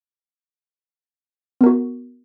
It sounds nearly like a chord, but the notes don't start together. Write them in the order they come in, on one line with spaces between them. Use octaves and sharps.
B3 A#4 F#4